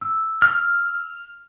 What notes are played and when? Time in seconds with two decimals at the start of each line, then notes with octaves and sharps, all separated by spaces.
0.01 E6
0.42 F6